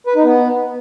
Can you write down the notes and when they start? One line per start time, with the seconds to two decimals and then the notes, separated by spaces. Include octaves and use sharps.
0.07 B4
0.15 D#4
0.24 B3